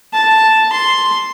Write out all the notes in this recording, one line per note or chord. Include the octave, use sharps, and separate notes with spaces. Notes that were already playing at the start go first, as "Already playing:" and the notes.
A5
C6